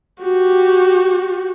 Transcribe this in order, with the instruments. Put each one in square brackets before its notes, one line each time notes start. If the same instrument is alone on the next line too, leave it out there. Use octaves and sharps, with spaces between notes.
[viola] F#4 G4